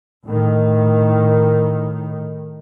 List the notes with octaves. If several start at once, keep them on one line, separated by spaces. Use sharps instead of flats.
A2 D#3